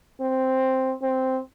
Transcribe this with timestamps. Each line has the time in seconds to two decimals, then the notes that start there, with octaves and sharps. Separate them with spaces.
0.21 C4
1.03 C4